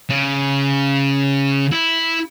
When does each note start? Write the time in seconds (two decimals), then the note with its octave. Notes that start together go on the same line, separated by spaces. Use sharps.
0.09 C#3
1.72 E4